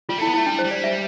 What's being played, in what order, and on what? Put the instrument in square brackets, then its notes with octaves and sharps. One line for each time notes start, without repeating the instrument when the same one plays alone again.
[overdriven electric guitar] G3 [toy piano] F4
[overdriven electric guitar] A3 [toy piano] E4
[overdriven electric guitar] B3
[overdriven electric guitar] A3 [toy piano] E4
[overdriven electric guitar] G3 [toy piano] D4
[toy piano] C5
[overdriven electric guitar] G3
[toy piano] D5
E5